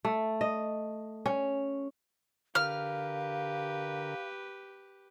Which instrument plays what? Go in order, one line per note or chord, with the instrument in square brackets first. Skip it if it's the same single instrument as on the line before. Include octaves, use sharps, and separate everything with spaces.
[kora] A3
D#5
C#4
[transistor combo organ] D3 A#4 [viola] G4 B4 [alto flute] F5 [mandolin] F6